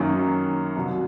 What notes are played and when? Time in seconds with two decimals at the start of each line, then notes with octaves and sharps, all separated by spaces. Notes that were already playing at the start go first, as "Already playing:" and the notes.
Already playing: F#2 D#3 F#3 A#3 C#4
0.76 C2 B2 F#3